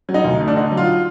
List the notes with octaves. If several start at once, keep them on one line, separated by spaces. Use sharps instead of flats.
F#3
D#4
D2
A3
D4
D3 D#4
F#3
F4